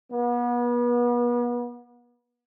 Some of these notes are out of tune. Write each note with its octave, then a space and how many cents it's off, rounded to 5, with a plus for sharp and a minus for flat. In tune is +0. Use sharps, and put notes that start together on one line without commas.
B3 -35